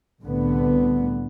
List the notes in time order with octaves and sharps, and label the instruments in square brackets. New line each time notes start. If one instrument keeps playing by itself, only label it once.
[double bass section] C2 A2 D3 B3